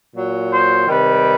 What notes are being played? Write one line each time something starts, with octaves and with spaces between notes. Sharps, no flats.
A#2 F#3
C5
C3 D#3 G3 B4